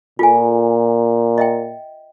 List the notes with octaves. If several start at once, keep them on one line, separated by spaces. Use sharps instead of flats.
A#2 F4 A4 G#5
D#5 E5 G5